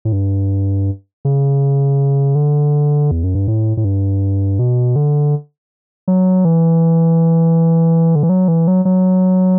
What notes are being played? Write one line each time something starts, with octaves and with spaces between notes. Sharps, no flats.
A2
G2
C#3
D3
E2
F#2
G2
A2
A2
G2
B2
D3
F#3
E3
D3
E3
F#3
E3
F#3
F#3